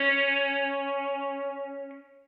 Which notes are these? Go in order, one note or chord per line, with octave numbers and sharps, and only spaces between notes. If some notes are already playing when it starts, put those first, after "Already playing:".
Already playing: C#4